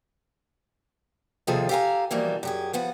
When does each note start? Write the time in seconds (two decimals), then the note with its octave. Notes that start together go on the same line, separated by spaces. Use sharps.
1.47 D#2 C3 F3 F4 G#4 A4
1.69 G4 A4 F5 G#5 A#5
2.11 B2 E3 F3 G3 A#3
2.43 F#2 G4 G#4
2.73 F3 B3 F#5